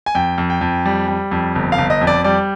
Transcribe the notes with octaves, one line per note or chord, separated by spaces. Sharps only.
G#5
F2 G5
F2
G5
F2
G3
G3
F2
G1
F5
G1
D#5
F2
D5
G3 D5